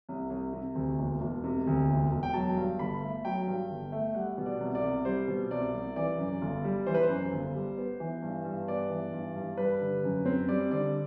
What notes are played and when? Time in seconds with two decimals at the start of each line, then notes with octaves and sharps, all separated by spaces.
0.09 C2
0.30 C2
0.53 C3
0.75 D2
0.99 E1
1.21 E1
1.44 C3
1.67 D2
1.90 E1
2.12 E1
2.23 G5
2.34 F#3 A5
2.56 G2
2.79 G1 B5
3.01 A3
3.25 F#3 G5
3.47 G2
3.71 G1
3.92 A3
4.15 G3 F#5
4.38 B2
4.46 D5
4.60 C2
4.75 D5
4.84 C2
5.05 G3 C5
5.28 B2
5.50 C2 D5
5.74 C2
5.96 E3 D5
6.18 F#2
6.41 G1
6.64 G3
6.86 E3 C5
6.94 B4
7.03 C5
7.09 F#2
7.32 G1
7.55 G3
7.77 B3
8.00 E3
8.22 G2
8.45 G2
8.67 B3 D5
8.90 E3
9.13 G2
9.36 G2
9.57 G3 B4
9.81 D3
10.04 F#2
10.25 C4
10.48 G3 D5
10.71 D3 D5